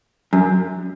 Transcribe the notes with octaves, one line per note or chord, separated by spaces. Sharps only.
F#2